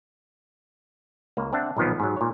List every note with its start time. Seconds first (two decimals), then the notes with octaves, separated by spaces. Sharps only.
1.37 C#2 A#3
1.53 C4 D4 E5 F#5
1.77 B1 A#2 D#3 F3 B3
2.00 G#2 F#3
2.17 A#2 C#5